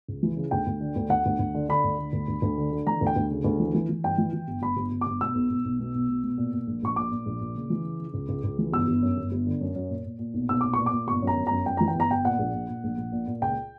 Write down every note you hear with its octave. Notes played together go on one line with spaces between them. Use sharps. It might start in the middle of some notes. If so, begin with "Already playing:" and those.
C#2
E3
C#3
D2 G5
D2
D3
D2
D2 F#5
D2
D2
D3
D3 B5
D2
D3
D2
D2
D2
D3
D3
E3 A#5
D2
G5
D2
C#3
D2
E3
E3
E3
G2 G5
E3
E3
G1
G1 B5
G1
G1
D6
G1
B2 E6
B1
B1
B1
B2
B1
B2
B2
A#2
A#2
A#1
A#1 C#6
A#2 D6
A#2
A#1
A#2
C#3
E3
C#3
C#3
C#2
C#2
C#2
E3
G1 E6
G1
F#2
G1
G1
D3
F#2
F#2
A#2
A#2
A#2
B1
B1 E6
A#2 D6
A#2 C#6
D6
A#2
G1 C#6
F#2
A#5
G1
F#2 A#5
F#2 G5
E3 A#5
G5
G1 A#5
G1 G5
A#2 F#5
A#1
A#2
A#2
A#1
A#1
A#2
A#2
C#2 G5